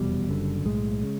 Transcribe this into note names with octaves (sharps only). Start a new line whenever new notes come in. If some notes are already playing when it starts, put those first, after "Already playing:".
Already playing: F1 E2 B2 G3
F#1 F#2 D3
B1 A2 G#3
C#3